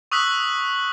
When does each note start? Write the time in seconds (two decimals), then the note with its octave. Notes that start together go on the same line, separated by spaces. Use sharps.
0.12 C#6 D#6 E6 F#6 B6 F#7